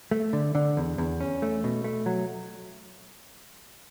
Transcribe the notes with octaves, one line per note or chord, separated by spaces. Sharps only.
A3
D3
D3
E2
E2
C#4
A3
B2
A3
F#3